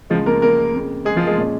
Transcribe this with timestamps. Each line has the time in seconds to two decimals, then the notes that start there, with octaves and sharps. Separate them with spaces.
0.10 C#2 C#3 F3 G#3 F4
0.26 A#3 A#4
0.42 A#3 A#4
0.74 F2 C#3 A#3
1.05 G#3 G#4
1.16 F3 F4
1.27 G#3 G#4
1.38 A#2 G#3 C#4